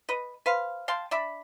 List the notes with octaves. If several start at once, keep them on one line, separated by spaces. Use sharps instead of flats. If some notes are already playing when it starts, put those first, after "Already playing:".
B4 D#5
B4 C5 F5
F5 G5 A5 C6
D4 D5 E5 B5